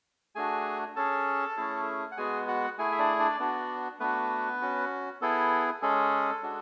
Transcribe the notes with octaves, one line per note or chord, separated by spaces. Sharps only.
A3 D4 F#4 G#4 G#5
C#4 G#4 A4 A5
A3 C#4 E4 G#4
F#5
G#3 B3 F#4 G#4 G#5
F#4 F#5
A3 E4 G#4 G#5
E5
D4 D5
D4 D5
B3 D4 F#4
A3 B3 D4 F#4 B4
C#4 F#4
B3 E4 G#4 A4
G#3 C#4 G#4 A4
G#3 D4 F#4